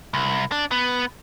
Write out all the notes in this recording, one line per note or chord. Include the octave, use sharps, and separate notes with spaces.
C2
D4
B3